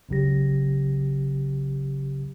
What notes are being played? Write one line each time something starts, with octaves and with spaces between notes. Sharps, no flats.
G1 C#2 C#3 F#3 G4 A#6